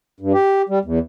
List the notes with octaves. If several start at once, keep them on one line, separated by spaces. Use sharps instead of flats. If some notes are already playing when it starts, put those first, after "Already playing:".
G2
G4
G3
E2